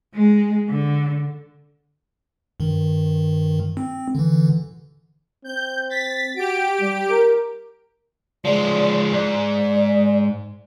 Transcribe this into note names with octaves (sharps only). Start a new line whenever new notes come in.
G#3
D3
G2 D#3
C4
D3 E3
C4 G6
A6 B6
F#4 G4 D7
G3
A#4
F3 G#3 D5
G#2 D5